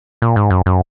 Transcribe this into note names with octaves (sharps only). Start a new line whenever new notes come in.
A#2
G#2
F#2
F#2